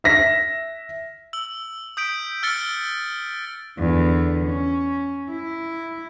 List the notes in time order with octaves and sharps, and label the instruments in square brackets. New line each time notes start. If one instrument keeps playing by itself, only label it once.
[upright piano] E5 A#6 B6
[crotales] E6 F#7
D#6 G6 B6 D7
E6 F6 G6 A6 C#7 G7
[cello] E2 D3
C#4
E4